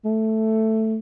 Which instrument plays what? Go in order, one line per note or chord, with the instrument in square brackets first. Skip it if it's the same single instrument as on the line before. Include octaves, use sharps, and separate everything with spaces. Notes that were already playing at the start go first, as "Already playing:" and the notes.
[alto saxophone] A3